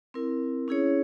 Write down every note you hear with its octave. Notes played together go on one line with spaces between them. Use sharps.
C4 E4 A#4
C#4 E4 G#4 C#5